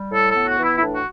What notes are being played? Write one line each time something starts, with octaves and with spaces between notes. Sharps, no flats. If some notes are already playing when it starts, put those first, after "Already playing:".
Already playing: G3
A2 A4
A4
B3
F#4
E3
E4
E4
A2 D4
F#4